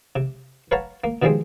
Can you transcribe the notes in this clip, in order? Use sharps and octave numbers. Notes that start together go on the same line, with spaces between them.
C3
B4 C#5 F5 F#5 A5 A#5
A#3
B2 D#3 F3 G3 G#3 C4